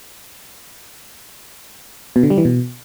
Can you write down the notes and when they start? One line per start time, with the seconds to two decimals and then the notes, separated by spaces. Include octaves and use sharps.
2.16 B2
2.23 D3
2.30 G3
2.38 E3
2.45 B2